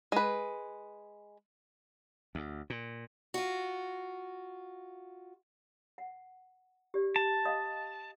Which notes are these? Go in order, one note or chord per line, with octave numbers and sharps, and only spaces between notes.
G#3 B4
D2
A#2
F4 F#4
F#5
G4 D5
A5
D#5 F5 D#6